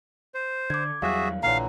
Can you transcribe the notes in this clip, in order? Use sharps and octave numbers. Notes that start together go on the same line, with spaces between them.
C5
D3 D6 G#6
E2 F#3 G3 F#4 G#4 E5 F5 F#6
A#1 A#2 D3 E3 C#5 F5 A#5